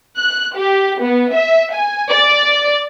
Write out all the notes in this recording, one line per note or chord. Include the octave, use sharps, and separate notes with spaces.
F#6
G4
B3
E5
G#5
D5